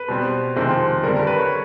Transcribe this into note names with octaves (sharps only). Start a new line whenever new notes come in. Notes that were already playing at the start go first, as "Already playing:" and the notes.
Already playing: B4
B2 G3 C4
F2 C3 D#3 G#3 C4
G2 D3 G3 A#4
A#4
B4
C#5